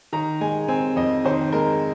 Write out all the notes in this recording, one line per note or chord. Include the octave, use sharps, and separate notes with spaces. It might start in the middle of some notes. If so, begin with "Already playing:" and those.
D#3 A#5
G#3 G#5
C4 G#5
F2 D#5
D#3 C5
G#3 A#4